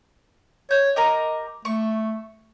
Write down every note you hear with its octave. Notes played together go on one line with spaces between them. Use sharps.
C#5 G6
G4 A#4 D#5 A#5
A3 C#6